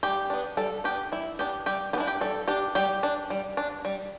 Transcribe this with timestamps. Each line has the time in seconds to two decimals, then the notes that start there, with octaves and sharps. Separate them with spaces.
0.03 G3 G4
0.30 B3 D4
0.57 G3 A4
0.84 B3 D4 G4
1.12 G3 E4
1.39 B3 D4 G4
1.66 G3 G4
1.93 B3 G4
1.98 D4 E4
2.07 G4
2.21 G3 A4
2.48 D4 G4
2.75 G3 G4
3.03 D4
3.30 G3
3.57 D4
3.85 G3